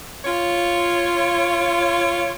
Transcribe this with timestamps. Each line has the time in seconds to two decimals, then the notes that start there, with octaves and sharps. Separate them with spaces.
0.24 F4 C#5